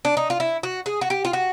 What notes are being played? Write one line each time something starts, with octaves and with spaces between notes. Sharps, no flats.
D4
D#4
F4
E4
F#4
G#4
F#4
G4
F4
F#4